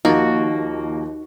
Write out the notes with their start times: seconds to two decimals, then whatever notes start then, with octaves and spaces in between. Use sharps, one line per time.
0.05 D#2 F3 A#3 D#4 F#4 A6